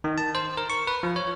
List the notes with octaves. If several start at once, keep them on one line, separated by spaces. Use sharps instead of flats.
D#3
A5
C5
A#4
C#6
B4
F3
C#5